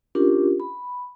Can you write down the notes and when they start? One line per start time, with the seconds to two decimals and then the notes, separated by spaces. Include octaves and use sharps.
0.15 C#4 D4 F4 G4 A#4
0.60 B5